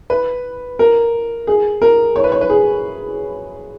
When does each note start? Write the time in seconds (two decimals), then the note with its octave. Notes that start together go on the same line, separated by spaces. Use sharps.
0.10 B4
0.79 A#4
1.47 G#4
1.82 A#4
2.16 C#5
2.24 B4
2.32 C#5
2.41 B4
2.50 G#4